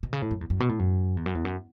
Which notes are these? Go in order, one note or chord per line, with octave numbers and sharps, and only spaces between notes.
B2
C#3
A2
F#2
E2
F#2
B2
A2
F#2
E2
F#2
E2
F#2